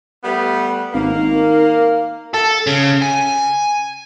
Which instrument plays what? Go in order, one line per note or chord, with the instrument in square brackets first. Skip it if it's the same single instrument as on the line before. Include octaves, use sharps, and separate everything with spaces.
[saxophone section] G3 A3 B3
[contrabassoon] G#1 [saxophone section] A#3
[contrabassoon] D#3
[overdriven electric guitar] A4
C#3
G#5